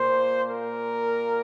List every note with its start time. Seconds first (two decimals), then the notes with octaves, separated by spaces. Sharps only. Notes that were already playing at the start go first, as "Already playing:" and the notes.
Already playing: A#2 A#3 C5
0.50 A#4